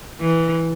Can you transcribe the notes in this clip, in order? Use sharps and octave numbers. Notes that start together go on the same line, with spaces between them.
E3